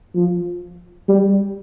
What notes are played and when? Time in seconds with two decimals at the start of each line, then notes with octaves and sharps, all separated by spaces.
0.16 F3
1.08 G3